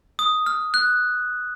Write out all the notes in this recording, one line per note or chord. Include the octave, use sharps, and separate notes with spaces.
D#6
F6
F#6